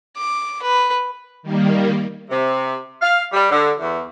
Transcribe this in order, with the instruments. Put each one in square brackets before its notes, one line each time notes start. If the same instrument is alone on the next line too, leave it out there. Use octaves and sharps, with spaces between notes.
[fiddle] D6
B4
[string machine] D#3 G3 A#3
[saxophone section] C3
F5
G3
D3
E2